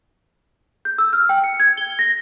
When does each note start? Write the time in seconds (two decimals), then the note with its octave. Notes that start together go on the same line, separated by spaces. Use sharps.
0.85 G6
0.98 E6
1.13 F6
1.29 G5
1.44 C#7
1.60 G#6
1.78 G7
1.99 A#6